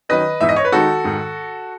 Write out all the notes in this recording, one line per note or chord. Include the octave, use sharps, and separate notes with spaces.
D#3 F#3 C#4 B4 D#5
G#2 E3 B3 D#4 E5
D#5
C#5
B4
D#3 G#3 D#4 F#4 A4
G#2 D#3 G#3